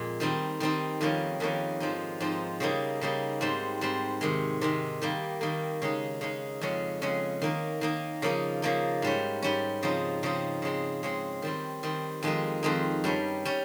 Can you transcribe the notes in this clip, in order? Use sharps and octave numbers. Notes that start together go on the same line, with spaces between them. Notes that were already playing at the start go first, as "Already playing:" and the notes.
Already playing: F2 A#2 G#3
D#3 G3 C4 D#4
D#3 G3 C4 D#4
F2 D#3 G3 A#3 C#4
F2 D#3 G3 A#3 C#4
G#2 F3 C4 D#4
G#2 F3 C4 D#4
C#3 G3 A#3 D#4
C#3 G3 A#3 D#4
G#2 G3 C4
G#2 G3 C4
C3 D#3 G#3
C3 D#3 G#3
D#3 G3 A#3
D#3 G3 A#3
C#3 G#3 D#4
C#3 G#3 D#4
F2 C#3 G#3 C#4
F2 C#3 G#3 C#4
D#3 A#3 D#4
D#3 A#3 D#4
C#3 F3 A#3 D#4
C#3 F3 A#3 D#4
G#2 G3 C#4
G#2 G3 C#4
C#3 F3 C4 D#4
C#3 F3 C4 D#4
C#3 G#3 C4
C#3 G#3 C4
D#3 G3 C4
D#3 G3 C4
F2 D#3 G#3 C4 D#4
F2 D#3 G#3 C4 D#4
G2 G3 C#4
G3 C#4